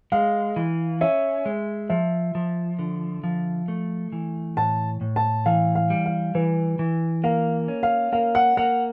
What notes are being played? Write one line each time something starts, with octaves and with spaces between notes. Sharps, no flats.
G#3 F5
E3
C#4 E5
G#3
F3 E5
F3
D3
F3
A3
E3
A2 A5
A2
A5
E3 F5
F5
G3
F5
E3 B4
E3
A#3 F5
C#4
F5
A#3 F5
F#5
A#3 F#5